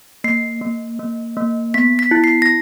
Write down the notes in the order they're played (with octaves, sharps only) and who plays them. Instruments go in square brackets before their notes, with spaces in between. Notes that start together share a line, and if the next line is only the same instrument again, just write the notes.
[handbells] A#3 C7
A#3
A#3
A#3
B3 B6
B6
E4
C7
A#6